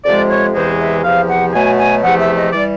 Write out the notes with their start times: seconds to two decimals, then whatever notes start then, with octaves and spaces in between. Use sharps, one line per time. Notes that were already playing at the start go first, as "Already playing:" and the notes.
0.05 F2 C3 F3 G#3 D5
0.30 C#5
0.55 E2 C3 E3 G#3 C5
0.79 E5
1.04 E2 C3 F3 F5
1.29 F#5
1.53 B2 F#3 A3 G#5
1.78 G#5
2.03 E2 C3 F3 A3 F#5
2.20 E5
2.36 D#5
2.53 E3 G3 D5